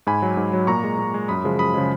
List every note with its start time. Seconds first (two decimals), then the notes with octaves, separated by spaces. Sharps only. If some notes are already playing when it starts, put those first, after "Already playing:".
0.07 G#2 G#5 B5
0.22 F#3
0.37 G#2
0.53 F#3
0.67 A#2 A#5 C#6
0.84 G#3
0.99 A#2
1.14 G#3
1.28 F#2 B5 D#6
1.44 C#3 F3 G#3
1.59 F#2 B5 D#6
1.74 C#3 F3 G#3